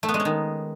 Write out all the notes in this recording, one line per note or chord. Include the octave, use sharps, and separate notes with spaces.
A3
B3
G#3
C#4
D#3